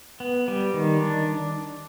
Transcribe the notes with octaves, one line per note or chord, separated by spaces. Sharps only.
B3
G3
D#3
D4